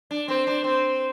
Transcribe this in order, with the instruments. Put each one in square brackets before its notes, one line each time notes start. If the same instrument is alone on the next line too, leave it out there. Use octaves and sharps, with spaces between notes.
[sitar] D4
[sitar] C4 [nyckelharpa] C5
[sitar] D4
[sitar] C4 [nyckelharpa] C5